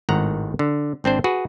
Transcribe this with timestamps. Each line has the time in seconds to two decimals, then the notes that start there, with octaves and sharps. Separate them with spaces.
0.09 G#1 A2 D#3 F#5 A#5
0.59 D3
1.04 G#1 C4 D4 C5
1.24 F#4 G#4 B4